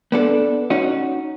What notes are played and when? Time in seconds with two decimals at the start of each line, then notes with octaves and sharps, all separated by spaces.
0.12 B3 D4 A4
0.70 C#4 D#4 F#4